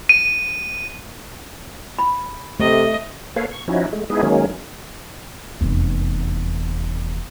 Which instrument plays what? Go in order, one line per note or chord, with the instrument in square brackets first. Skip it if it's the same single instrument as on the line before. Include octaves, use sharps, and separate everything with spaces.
[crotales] D#7
[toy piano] B5
[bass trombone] C3 [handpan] A3 [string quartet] D#5
[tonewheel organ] A#3 A4 B4 C#5 F5
C#6
F3 C#4 D#4 E4 F#4
G#3 A3
G#3 B3 D#4 E4 G#4
D#3 F#3 G#3 A#3 C#4
[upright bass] F1 E2